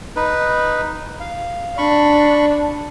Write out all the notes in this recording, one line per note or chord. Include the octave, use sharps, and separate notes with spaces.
D#4 B4
F5
D4 B5 C#6